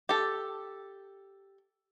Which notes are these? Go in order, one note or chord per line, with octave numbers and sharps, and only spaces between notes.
G4 A4